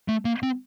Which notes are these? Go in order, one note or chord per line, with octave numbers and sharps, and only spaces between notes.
A3
A#3
C4